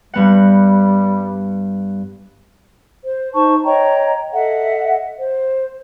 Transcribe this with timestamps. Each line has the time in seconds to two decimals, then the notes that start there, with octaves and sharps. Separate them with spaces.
0.14 G2 G3 B3 F#5
3.04 C5
3.34 D#4 C5 A5 C#6
3.64 C#5 D#5 G5 A#5
4.33 A4 D#5 E5 F#5
5.19 C5